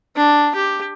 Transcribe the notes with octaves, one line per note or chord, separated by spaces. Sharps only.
D4
G4